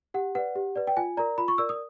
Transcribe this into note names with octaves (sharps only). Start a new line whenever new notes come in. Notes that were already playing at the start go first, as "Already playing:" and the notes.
G4 F#5
B4 D5 F#5
G4
B4 D5
G5
F4 G#5
A#4 D5 A#5
F4 B5
C#6
A#4 D5 E6
D#6